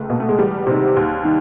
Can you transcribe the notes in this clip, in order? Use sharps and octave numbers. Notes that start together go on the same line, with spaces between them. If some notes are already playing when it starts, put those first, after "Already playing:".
Already playing: C#2 A3
B2 A#3
A3
G#3
E2 G3
C3 D#3
D#2
D#3